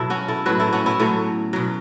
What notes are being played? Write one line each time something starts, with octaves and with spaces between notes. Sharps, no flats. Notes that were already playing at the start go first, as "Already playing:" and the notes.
Already playing: B2 F#3 B3 E4 A4
C#4 F#4
E4 A4
A2 F#3 F#4 B4
E4 A4
C#4 F#4
B3 E4
A2 F#3 A3 C#4
B2 F#3